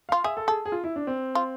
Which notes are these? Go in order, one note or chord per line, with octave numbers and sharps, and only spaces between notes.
F4 F5
G#4 E5
A4
G#4 A4
G#4
F4
E4
D4
C4
F4